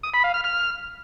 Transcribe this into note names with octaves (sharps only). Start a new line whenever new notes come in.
D#6
B5
F5
F6
F6